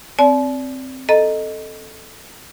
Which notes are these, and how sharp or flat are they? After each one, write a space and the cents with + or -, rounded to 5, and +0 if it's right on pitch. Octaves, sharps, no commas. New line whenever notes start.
C4 +0 D5 -25 A5 -45
A4 +0 D#5 -5 A#5 +0